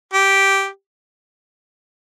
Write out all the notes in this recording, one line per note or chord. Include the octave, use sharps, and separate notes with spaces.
G4